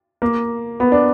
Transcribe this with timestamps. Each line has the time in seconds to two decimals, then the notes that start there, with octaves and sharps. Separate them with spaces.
0.22 A#3
0.80 B3
0.92 D4